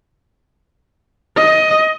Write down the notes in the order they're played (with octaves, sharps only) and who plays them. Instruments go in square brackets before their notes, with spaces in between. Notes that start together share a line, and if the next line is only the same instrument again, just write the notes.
[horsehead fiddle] D#5